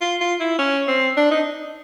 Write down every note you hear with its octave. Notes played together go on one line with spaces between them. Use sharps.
F4
F4
E4
C#4
C4
D4
D#4